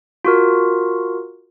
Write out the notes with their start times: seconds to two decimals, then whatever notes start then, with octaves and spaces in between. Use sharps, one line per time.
0.25 F4 F#4 A#4